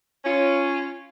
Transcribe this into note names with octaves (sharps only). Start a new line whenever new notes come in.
C#4 F4